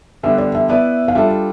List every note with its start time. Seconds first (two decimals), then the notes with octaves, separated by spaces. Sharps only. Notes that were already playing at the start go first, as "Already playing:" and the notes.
0.23 D3 G3 B3 D4 E5
0.38 D5
0.55 E5
0.69 B3 E4 B4 D5 E5
1.08 F5
1.15 G3 D4 F4 A4 E5